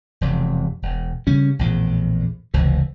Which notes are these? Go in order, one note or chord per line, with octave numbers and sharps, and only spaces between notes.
E1 F2 C3
E1
C#3 G3 C#4
A#1 E2 A2
F1 C#2 E3